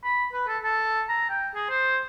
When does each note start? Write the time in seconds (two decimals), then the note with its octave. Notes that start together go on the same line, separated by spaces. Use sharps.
0.04 B5
0.33 B4
0.48 A4
0.64 A4
1.09 A#5
1.29 G5
1.55 G#4
1.70 C5